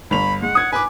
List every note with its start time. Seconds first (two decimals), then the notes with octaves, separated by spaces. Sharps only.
0.11 G1 B5 F7
0.42 G#3 F#5
0.55 D#6 G#6
0.73 B4 G#5 D6